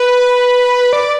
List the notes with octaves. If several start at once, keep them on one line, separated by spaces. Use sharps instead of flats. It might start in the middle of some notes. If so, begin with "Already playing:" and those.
Already playing: B4
D5